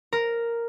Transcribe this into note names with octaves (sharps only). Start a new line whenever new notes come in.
A#4